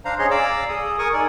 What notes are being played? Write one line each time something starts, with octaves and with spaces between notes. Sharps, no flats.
D4 C5 F5 A#5
C#4 G#4 C#5 D#5 C6
D5 F5 A#5 D6 E6
G#4 A4 D#6
A#4 G#5 C#6 D#6
D#4 A4 A#4 D5